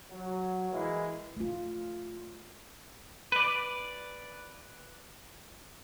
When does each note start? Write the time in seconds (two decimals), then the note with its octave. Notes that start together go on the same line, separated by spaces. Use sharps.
0.11 F#3
0.71 E3 G#3 A#3 E4
1.37 A3 F4
3.32 B4 D5